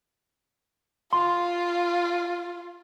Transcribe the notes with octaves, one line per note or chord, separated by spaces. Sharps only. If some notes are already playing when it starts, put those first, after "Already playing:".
F4 C6